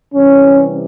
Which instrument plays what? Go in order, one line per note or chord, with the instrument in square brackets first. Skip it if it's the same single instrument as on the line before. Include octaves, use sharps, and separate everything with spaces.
[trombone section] C3 E3 G3 C#4